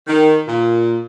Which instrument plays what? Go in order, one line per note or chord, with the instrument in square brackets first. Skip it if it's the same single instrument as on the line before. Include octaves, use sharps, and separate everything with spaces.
[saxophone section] D#3
A#2